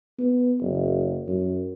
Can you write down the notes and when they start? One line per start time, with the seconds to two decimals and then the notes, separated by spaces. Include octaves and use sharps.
0.19 B3
0.61 F#1
1.27 F#2